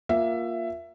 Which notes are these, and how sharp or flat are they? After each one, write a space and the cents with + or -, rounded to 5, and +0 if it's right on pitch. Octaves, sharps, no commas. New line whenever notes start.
A#3 +10 F4 +10 E5 +15